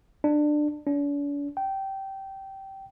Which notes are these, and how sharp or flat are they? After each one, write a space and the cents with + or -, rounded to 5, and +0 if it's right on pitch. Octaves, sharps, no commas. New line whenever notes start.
D4 +20
D4 -45
G5 -15